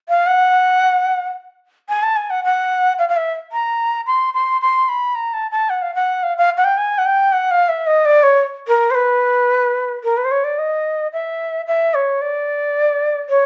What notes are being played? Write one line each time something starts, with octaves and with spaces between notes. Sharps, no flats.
F5
F#5
G#5
A5
G#5
F#5
F#5
F5
F5
E5
A#5
C6
C6
C6
B5
A#5
A5
A5
F#5
F5
F#5
F5
F5
F#5
G5
G#5
F#5
G5
F#5
F5
E5
D#5
D5
C#5
A#4
C5
B4
A#4
B4
C5
C#5
D5
D#5
E5
E5
C#5
D5
C#5